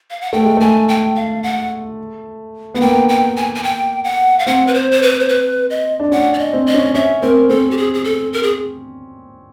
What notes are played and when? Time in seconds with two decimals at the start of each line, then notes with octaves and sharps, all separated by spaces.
0.10 F5
0.21 F#5
0.33 A3 G5
0.45 G#3
0.57 A3 G#5
0.88 G5
1.15 F5
1.43 F#5
2.74 B3 F#5
2.81 A#3 G5
3.09 G5
3.36 G#5
3.55 G#5
3.63 G5
4.04 F#5
4.39 F5
4.46 C4 F#5
4.67 B4
4.74 C5
4.91 C5
5.02 B4
5.20 C5
5.29 B4
5.70 D#5
6.00 D4
6.11 C#4 F#5
6.33 D5
6.39 D#5
6.53 C4
6.66 D#5
6.74 C#4
6.94 C#4 E5
7.22 C4 A#4
7.49 C4 A4
7.71 G4
7.77 G#4
7.94 G#4
8.04 A4
8.33 A#4
8.43 G#4